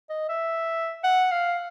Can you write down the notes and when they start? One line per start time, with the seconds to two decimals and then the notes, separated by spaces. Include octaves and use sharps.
0.10 D#5
0.29 E5
1.04 F#5
1.32 F5